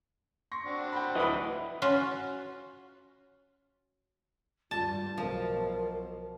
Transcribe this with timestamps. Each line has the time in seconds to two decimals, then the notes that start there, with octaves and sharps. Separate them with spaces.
0.52 C6 C#6 A#6
0.65 C4 D4 F#4
0.92 G5 B5
1.15 D1 E4 B4 D#5 B5
1.82 C#4 F4 F#4
4.71 G2 F4 A5
5.18 B1 B2 F3 A#4